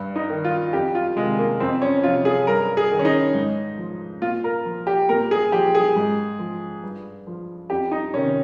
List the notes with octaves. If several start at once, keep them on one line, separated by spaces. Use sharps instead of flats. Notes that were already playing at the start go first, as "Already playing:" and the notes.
Already playing: G2
D#4
D#3
F4
F2 G4
F4
C3 D#3 G#3
A#3
F2 C4
C#4
C3 F3 F4
G#4
G2 A#4
G#4
D#3
C#4
D#4
G#2
F3
A#2 F4
A#4
F3
G4
A#2 A#4
G#4
F3 G4
G#4
G#2
F3
G2
F3
F2 G4
D#4
C3 D#3 C#4